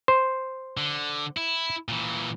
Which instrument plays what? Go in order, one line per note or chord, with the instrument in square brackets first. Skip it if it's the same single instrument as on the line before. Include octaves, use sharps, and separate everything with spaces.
[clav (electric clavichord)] C5
[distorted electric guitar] D3
E4
A#2 E3